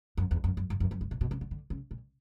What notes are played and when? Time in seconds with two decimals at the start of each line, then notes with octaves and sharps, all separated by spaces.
0.17 F#2
0.31 E2
0.44 F#2
0.57 F#2
0.70 G2
0.80 F#2
0.91 F#2
1.01 G2
1.11 A#2
1.21 B2
1.31 C#3
1.41 D3
1.51 D3
1.70 C#3
1.91 A#2